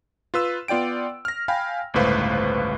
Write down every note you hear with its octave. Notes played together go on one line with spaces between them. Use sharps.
F4 B4 E6
B3 F4 D5 G5 D7
F6 A#6
F5 G5 G#5 B5
G1 C#2 A2 B4 C5 F5